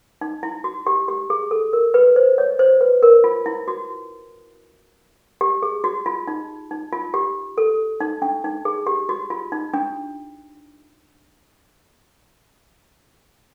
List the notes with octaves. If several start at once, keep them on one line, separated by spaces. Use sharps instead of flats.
D#4
E4
F#4
G4
G4
G#4
A4
A#4
B4
C5
C#5
C5
B4
A#4
F4
E4
F#4
G4
G#4
F#4
F4
D#4
D#4
F4
G4
A4
D#4
D4
D#4
G#4
G4
F#4
F4
D#4
D4